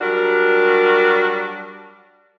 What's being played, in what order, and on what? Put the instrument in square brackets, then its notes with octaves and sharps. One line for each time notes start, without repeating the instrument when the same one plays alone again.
[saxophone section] F#3 G3 D4 F#4 A#4